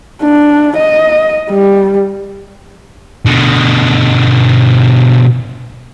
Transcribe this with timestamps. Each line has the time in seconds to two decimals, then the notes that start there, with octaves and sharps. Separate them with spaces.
0.22 D4
0.77 D#5
1.50 G3
3.26 B2 D3